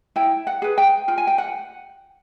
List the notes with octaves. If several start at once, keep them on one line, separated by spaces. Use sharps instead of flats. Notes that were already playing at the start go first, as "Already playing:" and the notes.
E4 G5
F#5
G#4 B4
G5
F4 G5
G#5
G5
F#5